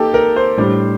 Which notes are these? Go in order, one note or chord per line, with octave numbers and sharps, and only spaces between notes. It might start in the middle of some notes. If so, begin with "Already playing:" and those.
Already playing: A#3 D#4 G4 A4
A#4
C5
A2 G3 D4